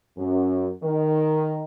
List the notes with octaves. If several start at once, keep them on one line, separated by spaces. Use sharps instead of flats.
F#2
D#3